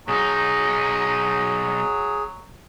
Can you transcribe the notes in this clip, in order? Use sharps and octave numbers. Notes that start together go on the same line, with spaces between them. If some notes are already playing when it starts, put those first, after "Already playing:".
B1 F#3 D#4 G#4